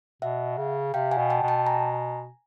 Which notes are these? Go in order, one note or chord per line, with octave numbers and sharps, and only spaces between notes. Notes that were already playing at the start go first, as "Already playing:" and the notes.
B2 E5 F#5
C#3
C3 F5 G5
F#5 G#5
B2
G5 A5
B2
G5 A5
G#5 A#5